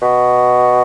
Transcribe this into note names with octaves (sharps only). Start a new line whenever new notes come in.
B2